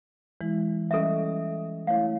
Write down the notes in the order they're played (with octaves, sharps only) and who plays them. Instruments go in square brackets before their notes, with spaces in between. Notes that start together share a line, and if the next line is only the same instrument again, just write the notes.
[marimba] E3 G#3 E4
[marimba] G3 C#4 D#5 [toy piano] A4 E5
[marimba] A3 E4 [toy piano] C#5 F5